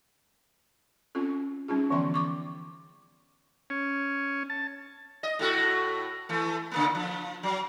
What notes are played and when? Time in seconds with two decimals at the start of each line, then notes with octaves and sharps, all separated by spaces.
1.15 C4 C#4 F4 A4
1.68 G3 C#4 D#4 F4 G#4
1.90 D3 E3 F3 B3 E5 C6
2.14 C#6 D6
3.70 C#4
4.50 A5
5.23 D#5
5.39 A2 A3 F#4
6.29 E3 A3
6.71 C#3 A#3 B3
6.95 F3
7.43 F#3